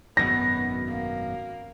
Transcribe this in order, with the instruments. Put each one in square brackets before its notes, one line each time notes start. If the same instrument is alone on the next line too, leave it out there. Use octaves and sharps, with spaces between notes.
[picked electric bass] G#1 F#2 B2 [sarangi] B3 [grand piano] A#6
[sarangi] A#3